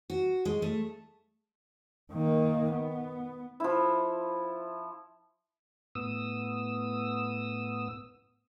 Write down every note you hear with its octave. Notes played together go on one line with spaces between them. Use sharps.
F#4
G#3
A3
D#3 A#3
B3
F3 E4
A2 B3 D#6 E6